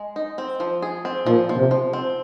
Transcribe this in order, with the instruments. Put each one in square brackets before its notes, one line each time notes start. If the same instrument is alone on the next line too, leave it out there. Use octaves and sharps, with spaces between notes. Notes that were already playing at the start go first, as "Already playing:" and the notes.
Already playing: [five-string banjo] G#3
D#4
C4
F3
G#4
C4
[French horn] A#2 [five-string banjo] F3
[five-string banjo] F3
[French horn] C3
[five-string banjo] F3
C4